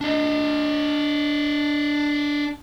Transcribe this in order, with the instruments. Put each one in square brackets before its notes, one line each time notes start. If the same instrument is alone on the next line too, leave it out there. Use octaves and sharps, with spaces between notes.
[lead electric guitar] D4 D#5